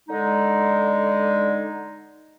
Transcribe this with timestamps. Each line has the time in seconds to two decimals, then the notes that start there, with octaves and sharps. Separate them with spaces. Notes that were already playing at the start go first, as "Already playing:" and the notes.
0.09 D3 G#3 D#4